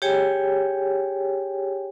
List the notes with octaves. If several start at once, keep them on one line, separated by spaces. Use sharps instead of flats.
G4 G#4 C#5 G5 G#5